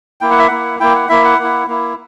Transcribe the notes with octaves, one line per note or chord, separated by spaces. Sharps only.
A#3 E4 G5
F#5
E5
A#3 E4 F#5
A#3 E4 G5
F#5
A#3 E4 E5
F#5
A#3 E4
A#3 E4